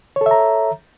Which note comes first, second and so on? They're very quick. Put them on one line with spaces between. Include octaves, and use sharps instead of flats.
C#5 A4 E5 A#5